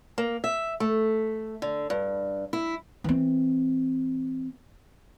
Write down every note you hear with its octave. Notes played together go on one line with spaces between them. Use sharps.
A#3
E5
A3
D3
G2
E4
E3 C4